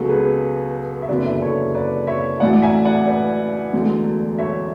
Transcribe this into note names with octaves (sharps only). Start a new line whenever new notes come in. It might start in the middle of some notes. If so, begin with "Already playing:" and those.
Already playing: C#2 B2 F#3 F#4 A4
G#4 B4
E5
F#1 E2 D3 F#3 B4 D5
E5
D5
A4 C#5
B4 D5
C#5 E5
A1 A2 F#3 D5 F#5
E5 G#5
D5 F#5
B4 D5
E1 D2 D3 F#3
C#5 E5